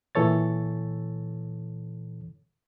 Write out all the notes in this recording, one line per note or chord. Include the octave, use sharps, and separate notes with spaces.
A#2 E3 A4 C#5 A6